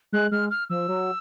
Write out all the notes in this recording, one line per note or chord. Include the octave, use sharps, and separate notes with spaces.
G#3 F#6
G#3 F6
F6
F3 E6
F#3